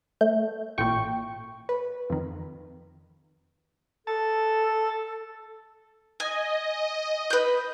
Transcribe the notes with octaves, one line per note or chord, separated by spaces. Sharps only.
A3 G6
A1 A#2 G5 C#6
B4
F2 D#3
A4 A5
D#5 G#5
B4 G6